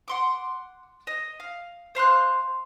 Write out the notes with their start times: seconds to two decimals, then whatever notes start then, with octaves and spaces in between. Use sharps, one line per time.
0.08 F#5 C6 D6
1.07 D#5
1.40 F5
1.95 C5 F5 C6 F#6